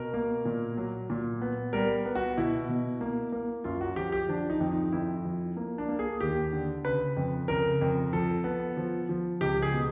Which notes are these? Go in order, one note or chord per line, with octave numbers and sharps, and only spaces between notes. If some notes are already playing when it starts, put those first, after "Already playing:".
Already playing: B2 A#4
A#3
A#2
F#3
A#2
B3
G3 A#4
B3
F#4
B2 E4
B2
A#3
A#3
F#2 F4
F#4
F3 G4
G4
F3 D4
D#4
F2
D#4
F2 E4
F3
A#3
D4
A#3
G#4
D#2 G4
D3
C#3 B4
F2
C#3 A#4
F2
F3 A4
B3
F3
F3
C#2 G4
G#4
B2